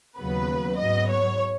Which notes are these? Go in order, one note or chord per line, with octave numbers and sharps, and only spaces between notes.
D#2 C#3 F#3 B3 B4
G#2 F#3 B3 D#5
C#5